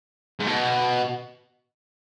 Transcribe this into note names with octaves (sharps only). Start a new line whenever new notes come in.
G#2
B2